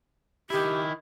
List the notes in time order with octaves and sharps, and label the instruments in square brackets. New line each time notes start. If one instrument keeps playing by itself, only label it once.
[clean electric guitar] D#3 E4 [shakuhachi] G4